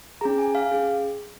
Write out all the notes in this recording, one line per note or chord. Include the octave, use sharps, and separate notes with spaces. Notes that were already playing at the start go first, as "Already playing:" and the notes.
C#4 G#4 A#5
G#5
F5
C#4 G#4